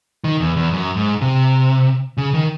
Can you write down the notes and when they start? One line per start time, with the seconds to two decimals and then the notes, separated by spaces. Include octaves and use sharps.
0.24 D#3
0.40 E2
0.57 E2
0.73 F#2
0.96 G#2
1.21 C3
2.17 C#3
2.34 D#3